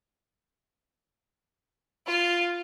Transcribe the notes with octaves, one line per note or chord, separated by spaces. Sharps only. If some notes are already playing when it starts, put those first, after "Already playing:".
F4